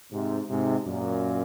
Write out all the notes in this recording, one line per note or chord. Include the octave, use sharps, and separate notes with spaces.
G#2 C3
G#2 C3
F#2 A#2